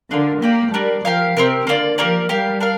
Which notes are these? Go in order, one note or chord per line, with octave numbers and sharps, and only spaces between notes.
D3 D4 F4 A#4
A#3 G4 D5 G5
G3 D4 A#4 D5
F3 G4 A#4 F5
C3 C4 G4 A#4
D3 A#3 F4 D5
F3 A#3 G4 A#4 D5
G3 G4 A#4 F5
D4 A#4 F5